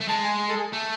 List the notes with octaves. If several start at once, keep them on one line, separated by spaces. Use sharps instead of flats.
A3
G#3 A5
G#5
A4
G#4
A3